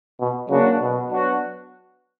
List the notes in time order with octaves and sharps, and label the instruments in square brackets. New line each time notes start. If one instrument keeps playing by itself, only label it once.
[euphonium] B2
[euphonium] C#3 [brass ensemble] F#3 A#3 D4 F#4
[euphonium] B2
[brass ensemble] F#3 B3 D4 F#4